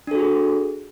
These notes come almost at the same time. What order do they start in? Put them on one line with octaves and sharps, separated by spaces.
D4 A4 F#4 G#4